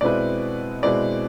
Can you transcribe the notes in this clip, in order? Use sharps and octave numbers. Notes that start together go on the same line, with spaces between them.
B2 G#3 C4 E4 B4 D5
B2 G#3 C4 E4 B4 D5